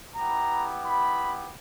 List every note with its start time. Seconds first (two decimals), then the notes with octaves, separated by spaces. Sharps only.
0.16 B3 E4 G4 A#5
0.85 B5